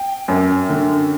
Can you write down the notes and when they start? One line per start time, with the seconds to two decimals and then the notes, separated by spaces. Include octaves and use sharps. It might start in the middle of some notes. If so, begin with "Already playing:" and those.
Already playing: G5
0.28 F#2
0.69 D3